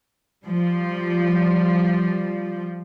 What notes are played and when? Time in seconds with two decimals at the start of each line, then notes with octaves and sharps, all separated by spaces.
0.43 F3 G3